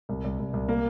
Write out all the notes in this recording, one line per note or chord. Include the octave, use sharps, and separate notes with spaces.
C2
C2
C2
C2
A#3